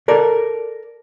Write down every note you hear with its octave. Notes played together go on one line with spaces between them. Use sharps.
A4 A#4 D5